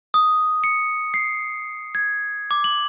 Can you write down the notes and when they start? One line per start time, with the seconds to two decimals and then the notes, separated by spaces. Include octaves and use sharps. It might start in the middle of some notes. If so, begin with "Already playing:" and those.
0.14 D#6
0.64 C#7
1.14 C7
1.95 G#6
2.51 D6
2.64 F#7